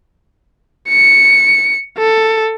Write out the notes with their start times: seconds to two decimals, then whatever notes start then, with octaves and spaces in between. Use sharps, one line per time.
0.89 C#7
1.98 A4